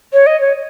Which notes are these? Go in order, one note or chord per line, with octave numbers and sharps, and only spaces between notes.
C#5
D#5
C#5